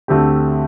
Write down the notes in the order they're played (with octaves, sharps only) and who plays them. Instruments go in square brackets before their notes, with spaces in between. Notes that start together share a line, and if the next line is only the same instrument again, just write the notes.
[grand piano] D2 D3 A3 C4 G4